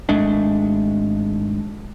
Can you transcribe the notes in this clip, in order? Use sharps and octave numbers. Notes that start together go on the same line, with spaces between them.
G#1 G#3 A3 D4